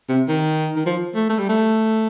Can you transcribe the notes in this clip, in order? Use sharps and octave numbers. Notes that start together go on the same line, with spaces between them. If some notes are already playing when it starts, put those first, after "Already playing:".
C3
D#3
D#3
F3
A3
A3
G3
A3